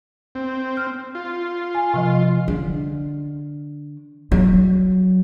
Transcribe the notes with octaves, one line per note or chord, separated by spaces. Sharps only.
C4
F6
F4
G#5
C3 F3 D#5
D3
F#3